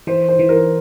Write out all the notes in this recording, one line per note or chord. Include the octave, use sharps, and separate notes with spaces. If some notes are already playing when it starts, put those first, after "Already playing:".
E3 C5
C5
E3
A#4